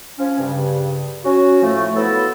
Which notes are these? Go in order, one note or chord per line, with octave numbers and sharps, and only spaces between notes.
F3 C#4
G2 C#3
C#4 F#4
A2 F3 A3
F3 F#3 B3 E4 F#4 A4